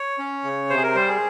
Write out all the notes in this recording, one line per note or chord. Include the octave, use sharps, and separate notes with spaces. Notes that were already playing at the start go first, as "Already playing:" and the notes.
Already playing: C#5
C#4
C#3
C3 C5
G#4
A#4
G3 C5
G#4